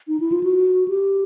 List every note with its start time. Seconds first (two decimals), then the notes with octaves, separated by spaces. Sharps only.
0.08 D#4
0.20 E4
0.32 F4
0.43 F#4
0.88 G4